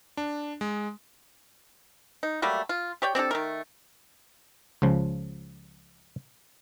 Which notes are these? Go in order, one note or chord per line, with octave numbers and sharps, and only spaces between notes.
D4
G#3
D#4
F#3 G3 A3 A#3
F4
G4 C#5 D5 G5
C4 D4 G4 A4
D#3 A3 A#4
C#2 C#3 F3